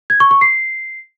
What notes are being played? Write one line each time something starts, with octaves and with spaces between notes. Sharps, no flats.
G#6
C#6
C#6
C7